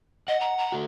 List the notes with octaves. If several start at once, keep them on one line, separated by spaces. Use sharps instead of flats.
D#5 F#5
A#5
A#5
A3 F#4